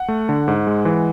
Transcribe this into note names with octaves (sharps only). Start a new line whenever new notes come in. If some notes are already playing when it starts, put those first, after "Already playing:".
Already playing: F#5
A3
D3
G#2
G#3
E3